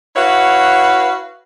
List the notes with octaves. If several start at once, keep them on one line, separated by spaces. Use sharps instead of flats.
E4 F#4 B4 C#5 F5 F#5